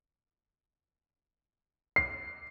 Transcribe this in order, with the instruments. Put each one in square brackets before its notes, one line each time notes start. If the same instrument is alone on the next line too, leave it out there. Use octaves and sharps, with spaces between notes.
[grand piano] C7